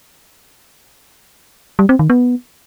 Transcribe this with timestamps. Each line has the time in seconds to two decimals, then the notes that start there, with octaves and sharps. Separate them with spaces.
1.79 G3
1.89 C4
1.99 D#3
2.10 B3